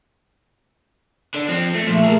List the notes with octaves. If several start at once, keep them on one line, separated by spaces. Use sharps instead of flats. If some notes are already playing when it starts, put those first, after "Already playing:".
D3 D4
F3 C4
A3
A#2 F3 A3
G#4 A#4